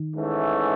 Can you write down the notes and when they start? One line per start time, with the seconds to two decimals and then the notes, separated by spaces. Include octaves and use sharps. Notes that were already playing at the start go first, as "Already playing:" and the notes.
Already playing: D#3
0.15 G#2 E3 A3 C#4